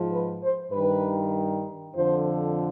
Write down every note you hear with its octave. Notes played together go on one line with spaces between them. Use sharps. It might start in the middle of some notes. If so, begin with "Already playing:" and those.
Already playing: G#2 F3
B4
C5
G2 D#3 B4
F2 D3 F3 C5